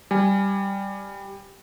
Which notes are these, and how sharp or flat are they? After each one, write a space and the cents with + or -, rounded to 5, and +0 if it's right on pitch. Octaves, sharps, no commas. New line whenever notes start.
G3 +0 G#5 +0